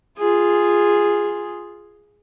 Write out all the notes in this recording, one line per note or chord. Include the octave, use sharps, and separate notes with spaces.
F4 G#4